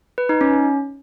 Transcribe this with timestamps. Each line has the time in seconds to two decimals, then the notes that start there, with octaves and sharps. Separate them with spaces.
0.18 B4
0.29 D#4
0.41 C#4